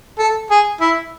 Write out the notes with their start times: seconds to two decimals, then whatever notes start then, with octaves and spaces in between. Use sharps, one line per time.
0.19 A4
0.50 G#4
0.81 E4